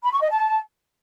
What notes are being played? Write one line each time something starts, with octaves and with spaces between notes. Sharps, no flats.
B5
C#6
D#5
A5